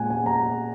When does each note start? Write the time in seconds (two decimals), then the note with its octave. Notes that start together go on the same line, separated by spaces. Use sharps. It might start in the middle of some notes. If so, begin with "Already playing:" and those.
Already playing: A#2 G#3 C#4 F#5 G#5
0.10 G#5
0.26 A#5